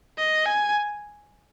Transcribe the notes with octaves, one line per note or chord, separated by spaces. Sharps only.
D#5
G#5